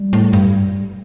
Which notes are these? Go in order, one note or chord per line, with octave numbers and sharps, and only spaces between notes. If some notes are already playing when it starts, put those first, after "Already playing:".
Already playing: G3
A2
G2